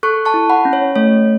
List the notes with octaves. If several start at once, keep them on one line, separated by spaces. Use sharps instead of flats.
A4 C#6 F#6
A5 C#6
E4
F#5 B5
C#4
C#5
A3 C#5